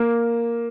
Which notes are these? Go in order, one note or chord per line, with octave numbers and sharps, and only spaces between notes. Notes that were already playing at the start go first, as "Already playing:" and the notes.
Already playing: A#3